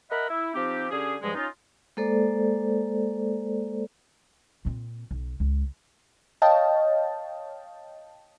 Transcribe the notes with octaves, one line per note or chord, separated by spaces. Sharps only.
A#4 D#5 E5 F#5 B5
E4
F3 C4 D#4 G4
D3 C#4 G4 G#4
G2 F3 G3 G#3
C#4 D#4 F4
G#3 A#3 A4 C5 D5
A#2 C4
B1
C#2
C#5 D#5 F5 G5 A5